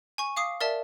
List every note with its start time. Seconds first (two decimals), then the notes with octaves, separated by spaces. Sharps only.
0.18 G#5 C#6
0.37 F5 D6 D#6 C7
0.61 A#4 D5 E5 A5